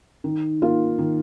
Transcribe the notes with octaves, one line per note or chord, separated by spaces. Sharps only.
D#3
A#3 F4
D#3